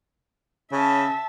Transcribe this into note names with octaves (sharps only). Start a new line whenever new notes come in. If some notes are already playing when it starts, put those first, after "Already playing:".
C#3 C#4 E5 A5